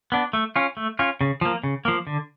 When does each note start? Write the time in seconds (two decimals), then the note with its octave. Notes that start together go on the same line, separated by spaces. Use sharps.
0.12 B3 D4
0.33 A3
0.56 C#4 F4
0.77 A3
0.99 C#4 F4
1.21 C#3
1.41 F3 A#3
1.64 C#3
1.85 F3 A#3
2.07 D3